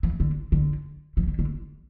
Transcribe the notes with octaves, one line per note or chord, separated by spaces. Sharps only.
E3
D3
D3
E3
D3
D3